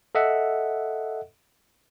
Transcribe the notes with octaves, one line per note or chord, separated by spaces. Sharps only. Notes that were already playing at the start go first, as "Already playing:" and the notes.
A4 D#5 E5 F#5